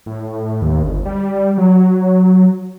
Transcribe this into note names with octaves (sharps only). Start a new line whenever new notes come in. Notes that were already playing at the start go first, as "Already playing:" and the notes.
A2
D#2
G1
G3
F#3